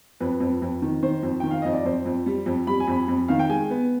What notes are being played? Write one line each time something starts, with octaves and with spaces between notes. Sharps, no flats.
F2 B4
F2
F2
D#3
D#3 C5
F2
D#3 G5
F5
F2 D#5
D5
F2 C5
F2
G3
F2
G3 B5
G#5
F2 B5
F2
D#3 F5
G5
G#3 G#5
B3